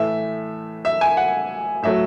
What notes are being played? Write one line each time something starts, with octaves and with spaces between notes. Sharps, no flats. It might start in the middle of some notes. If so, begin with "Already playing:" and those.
Already playing: A2 E3 A3 E5
E5
G#5
F#5
A2 F#3 A3 E5